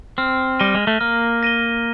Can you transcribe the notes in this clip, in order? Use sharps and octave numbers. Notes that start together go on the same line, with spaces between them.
C4 F6
G3 A#6 D#7 G7
G#3
A3
A#3 F6
A#6 D#7 G7